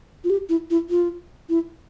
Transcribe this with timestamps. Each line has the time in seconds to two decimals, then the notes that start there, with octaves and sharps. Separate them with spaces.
0.24 F4
0.30 G4
0.49 E4
0.70 E4
0.90 F4
1.49 E4